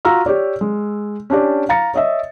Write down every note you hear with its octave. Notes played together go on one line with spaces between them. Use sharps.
F4 F#4 A#5 E6 F6
G4 C#5 D5
G#3
C#4 D4 G4 D5
F5 A#5 A6 C#7
C#5 D#5 E5